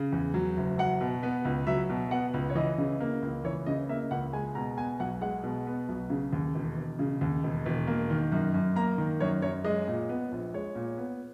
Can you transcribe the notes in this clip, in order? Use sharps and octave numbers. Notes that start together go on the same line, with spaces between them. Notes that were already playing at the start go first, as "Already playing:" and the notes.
Already playing: C#3
E2
F#3
F#1
F#3 F#5
B2
B3
C#2
F#3 E5
B2
B3 F#5
C#2
C#5
E3 D#5
C#3
A#3
C#2
E3 C#5
C#3 D#5
A#3 E5
C#2 F#5
G#3 G#5
B2 A#5
B3 G#5
B1 F#5
G#3 F#5
B2
B3
B1
C#3
D#2
E1
E1
C#3
D#2
E1
E1
A#3
D#3
F#2
F#2
A#3 A#5
D#3
F#2 C#5
F#2 C#5
G#3 D#5
A#2
B3
A#1
G#3 C#5
A#2
B3